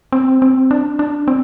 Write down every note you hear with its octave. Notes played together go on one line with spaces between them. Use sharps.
C4
C4
D4
D4
C4